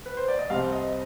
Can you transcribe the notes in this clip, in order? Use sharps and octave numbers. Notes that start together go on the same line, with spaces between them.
B4
C5
D5
D#5
C2 C3 G3 C4 F5
D#5